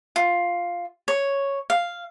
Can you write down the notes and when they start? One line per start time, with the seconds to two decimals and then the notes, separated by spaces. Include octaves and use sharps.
0.16 F4
1.08 C#5
1.70 F5